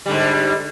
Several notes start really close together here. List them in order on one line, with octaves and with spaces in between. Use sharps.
G3 D3 G#2